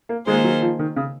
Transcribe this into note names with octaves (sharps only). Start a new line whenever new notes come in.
A#3
D#3 G#3 A#3 F4 G#4 C5
F#3
F3
D#3
C#3